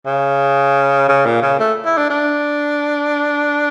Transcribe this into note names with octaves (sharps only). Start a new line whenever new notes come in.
C#3
C#3
A#2
C#3
A3
E4
D4
D4